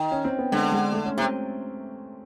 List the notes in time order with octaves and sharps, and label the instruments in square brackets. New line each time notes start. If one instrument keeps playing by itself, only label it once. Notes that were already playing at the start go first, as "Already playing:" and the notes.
Already playing: [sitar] D#3
[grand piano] C#4
C4
B3
[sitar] D3 [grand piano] G#3
[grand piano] G#3
A3
C#4
[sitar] C3 [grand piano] C4